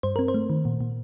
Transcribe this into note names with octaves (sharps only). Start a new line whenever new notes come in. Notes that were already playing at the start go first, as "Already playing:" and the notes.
G2 C5
C4 A#4
C5
A3
D#3
A#2
A#2